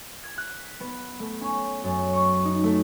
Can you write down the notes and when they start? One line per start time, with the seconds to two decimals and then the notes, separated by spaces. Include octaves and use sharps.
0.24 G#6
0.38 F#6
0.58 B6
0.80 B3
1.20 A3
1.41 C#4
1.84 F#2
2.13 C#6
2.45 D#4
2.64 A3